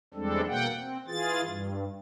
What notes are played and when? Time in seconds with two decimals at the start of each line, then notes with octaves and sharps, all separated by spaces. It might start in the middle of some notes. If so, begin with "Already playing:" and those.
0.14 E2 G3 G#3 C4 D4 A4
0.47 B2 A#3 F#5 G5
0.78 C4
1.08 E3 F4 G#4 A6
1.43 G2